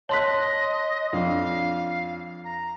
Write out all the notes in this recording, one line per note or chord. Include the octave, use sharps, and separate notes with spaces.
C#5 D#5 A5 C6 F#6 B6
F2 D4 F5
A#5